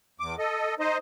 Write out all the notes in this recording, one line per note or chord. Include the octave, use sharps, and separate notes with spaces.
E2 D6
A4 D#5
D#4 C5 D#5